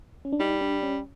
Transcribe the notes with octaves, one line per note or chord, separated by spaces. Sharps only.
C#4
D4
G3 D#4
D4
C#4